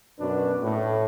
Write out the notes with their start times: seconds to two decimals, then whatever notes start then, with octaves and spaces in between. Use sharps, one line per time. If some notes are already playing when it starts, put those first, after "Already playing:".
0.20 F#2 B2 D4 B4
0.63 A2